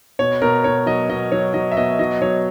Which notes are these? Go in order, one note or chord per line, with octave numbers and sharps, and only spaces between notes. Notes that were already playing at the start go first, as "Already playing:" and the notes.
B2 C#5
B2 A#4
B2 C#5
F#3 D#5
B2 D#5
F#3 C#5
F#3 D#5
E5
B2 D#5
F#3 D#5
F#3 C#5